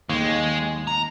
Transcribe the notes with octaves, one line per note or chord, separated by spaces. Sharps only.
D#2 G#3
A#5